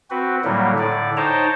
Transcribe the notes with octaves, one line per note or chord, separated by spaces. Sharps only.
C4 F#4 B4
A2 D3 F#3 G3 A#3
A2 D3 D5
D#4 C5 C#5 G5 A5 A#5